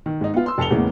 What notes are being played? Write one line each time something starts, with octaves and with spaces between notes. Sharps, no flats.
D#3
G#2 D#4
B3 F4
C6 E6
F1 A5 C#7 F7 G7
E2 A2 C#3 G#3 A#3 B3